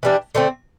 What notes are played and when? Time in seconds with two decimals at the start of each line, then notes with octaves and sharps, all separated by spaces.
0.03 E3 G3 D4
0.35 D3 A3 C4